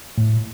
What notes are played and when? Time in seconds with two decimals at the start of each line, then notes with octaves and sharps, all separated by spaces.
0.18 A2